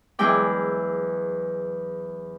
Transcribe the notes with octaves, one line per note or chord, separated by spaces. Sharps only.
E2 F#3 G#3 E4 G5 D6